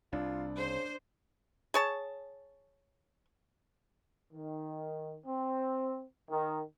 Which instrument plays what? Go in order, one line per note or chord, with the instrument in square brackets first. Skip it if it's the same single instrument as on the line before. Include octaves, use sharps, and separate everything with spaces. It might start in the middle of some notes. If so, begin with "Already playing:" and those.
[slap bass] C2 [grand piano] D4 [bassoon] F4
[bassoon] C#3 [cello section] C5
[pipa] G#4 C#5 A5
[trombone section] D#3
C4
D#3